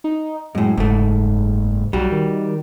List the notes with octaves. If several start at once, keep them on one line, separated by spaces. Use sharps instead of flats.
D#4
F#2 A2 G#3
F#1 G#2 A3
B1 G3 F#4
D#3